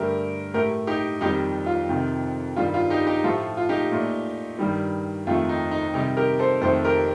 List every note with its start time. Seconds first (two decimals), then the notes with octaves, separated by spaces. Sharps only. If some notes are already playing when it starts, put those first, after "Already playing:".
Already playing: G2 D3 A3 G4 A#4
0.54 A2 A3 G4 A#4
0.87 D#4 G4
1.21 F2 D#3 G3 D#4 G4
1.66 F4
1.89 F2 C3 D#3
2.56 G2 D#3 G3 F4
2.74 F4
2.90 D#4 G4
3.07 D#4 G4
3.24 A2 F3 A3 F4 A4
3.57 F4
3.69 D#4 G4
3.92 A#2 A3
4.59 G2 D#3 G3
5.27 F2 D#3 A3 F4
5.49 D#4
5.71 D#4
5.94 C3 D#3 G3 D#4 G4
6.17 G4 A#4
6.39 A4 C5
6.61 F2 D#3 A3 A4 C5
6.84 G4 A#4